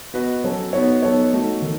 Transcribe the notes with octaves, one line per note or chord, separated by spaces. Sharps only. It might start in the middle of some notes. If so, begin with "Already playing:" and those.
B3 F#4 B4 D#5
F#3 C#4 F#4 A4
B3 D#4 F#4 C#5
F#3 B3 D#4 A4 C#5
A3 D#4 F#4
D#3